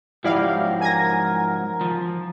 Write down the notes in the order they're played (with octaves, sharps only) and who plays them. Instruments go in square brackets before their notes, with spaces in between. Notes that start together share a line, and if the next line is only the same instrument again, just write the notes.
[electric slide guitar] G#2 F3 F#3 [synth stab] E4 D5 F5 [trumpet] G4
[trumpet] A#4 [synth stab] G#5 G#6 A#6
[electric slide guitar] F3